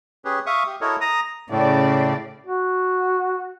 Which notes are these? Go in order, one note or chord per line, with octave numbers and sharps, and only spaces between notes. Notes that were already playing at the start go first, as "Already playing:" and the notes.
C#4 G4 G#4 B4
E5 F5 C#6 D#6
G4
E4 F#4 A4 A#4 C#5 D#5
A#5 D#6
A2 C#3 D5
F#4